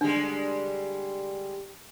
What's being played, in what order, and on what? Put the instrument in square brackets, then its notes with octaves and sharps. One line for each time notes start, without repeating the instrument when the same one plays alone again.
[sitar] D3 G3 G#3 [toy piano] D4